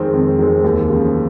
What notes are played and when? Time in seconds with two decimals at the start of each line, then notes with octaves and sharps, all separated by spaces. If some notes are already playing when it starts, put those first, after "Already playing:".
Already playing: F2 D#3 G#3 C4
0.14 F2
0.39 D#3 G#3 C4
0.64 D#2
0.90 C#3 F3